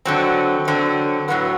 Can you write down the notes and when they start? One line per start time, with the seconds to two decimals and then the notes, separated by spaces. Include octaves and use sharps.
0.05 D3 F#3 C4
0.68 D3 F#3 C4
1.28 A2 F#3 B3